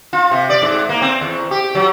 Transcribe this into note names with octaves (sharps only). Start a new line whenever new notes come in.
F4
C3
D5
G#2
A#3
C4
E2
G4
F#3